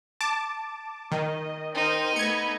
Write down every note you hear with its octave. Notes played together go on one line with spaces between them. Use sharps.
A5 D6
D#3 D#5
D#4 A#4 C5 G5
A3 B3 B5 G#6 C#7